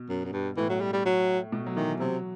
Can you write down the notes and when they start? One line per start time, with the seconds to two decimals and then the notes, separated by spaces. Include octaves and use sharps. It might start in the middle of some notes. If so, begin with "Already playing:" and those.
Already playing: B2
0.10 F#2
0.25 F#2
0.33 G2
0.57 A2 E3
0.70 F#3
0.81 G3
0.93 G3
1.05 F#3
1.52 B2
1.66 F#3
1.76 D#3 E3
2.00 C3 F#3